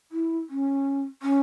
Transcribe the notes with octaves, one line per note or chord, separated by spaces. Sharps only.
E4
C#4
C#4